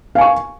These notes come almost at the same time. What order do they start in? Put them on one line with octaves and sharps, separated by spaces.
F5 G#5 C#6